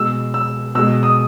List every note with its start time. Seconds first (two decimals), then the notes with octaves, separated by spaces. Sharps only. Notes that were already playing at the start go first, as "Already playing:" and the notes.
Already playing: B2 G#3 E6
0.34 E6
0.75 B2 G#3 E6
1.03 D#6